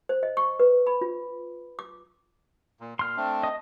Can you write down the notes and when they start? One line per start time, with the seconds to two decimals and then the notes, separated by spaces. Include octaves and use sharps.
0.09 C5
0.23 D#5
0.37 C#6
0.60 B4
0.87 B5
1.01 F4
1.79 D6
2.81 A#2
2.99 A#2 C6 F6
3.16 A3 C4 D4
3.43 D#5 D#6